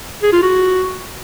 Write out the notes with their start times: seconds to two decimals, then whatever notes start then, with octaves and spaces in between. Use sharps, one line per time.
0.22 G#4
0.32 F4
0.42 F#4